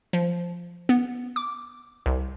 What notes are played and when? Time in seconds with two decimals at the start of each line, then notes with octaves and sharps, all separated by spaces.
0.13 F3
0.89 B3
1.36 D6
2.06 C2